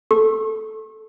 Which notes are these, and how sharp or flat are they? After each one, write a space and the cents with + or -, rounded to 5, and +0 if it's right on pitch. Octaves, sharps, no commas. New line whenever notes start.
A4 -5 C#6 -40